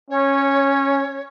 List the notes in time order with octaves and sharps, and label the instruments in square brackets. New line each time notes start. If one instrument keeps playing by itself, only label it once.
[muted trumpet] C#4 [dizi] C#5